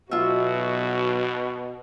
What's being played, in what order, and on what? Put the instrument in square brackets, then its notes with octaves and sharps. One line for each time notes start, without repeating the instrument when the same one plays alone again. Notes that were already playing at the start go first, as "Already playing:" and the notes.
[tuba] B1 [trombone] B2 [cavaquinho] F4 E5 [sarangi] F#4